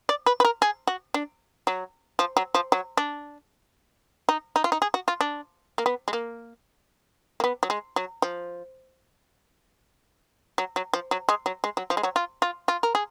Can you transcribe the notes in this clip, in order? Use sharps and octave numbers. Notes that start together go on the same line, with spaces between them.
D5
B4
B4
A#4
G#4
F#4
D4
F#3
F3
F#3
F3
F#3
D4
D#4
D#4
F4
D#4
G#4
F#4
F4
D4
A#3
B3
G#3
A#3
A#3
B3
F#3
G#3
F#3
F3
F#3
F#3
F3
F#3
G#3
F#3
G#3
F#3
F3
G#3
F#3
F4
F4
F4
A#4
G#4